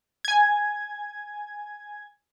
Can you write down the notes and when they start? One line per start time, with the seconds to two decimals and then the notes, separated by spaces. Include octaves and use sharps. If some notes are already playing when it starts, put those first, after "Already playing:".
0.25 G#5 G#6